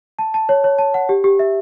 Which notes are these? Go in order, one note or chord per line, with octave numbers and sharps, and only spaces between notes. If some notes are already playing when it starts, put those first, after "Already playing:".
A5
A5
C#5
C#5
A5
F#5
G4
G4
E5